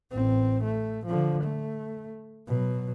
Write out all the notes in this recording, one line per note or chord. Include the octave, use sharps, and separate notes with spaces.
A1 C4
A3
D3 F3
A3
B2 F#3